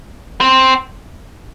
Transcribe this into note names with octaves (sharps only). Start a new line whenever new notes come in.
C4